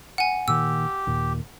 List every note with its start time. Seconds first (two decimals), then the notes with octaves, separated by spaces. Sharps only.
0.18 F#5 G#5
0.48 A#2 D#3 G4 E6
1.07 D#2 A#2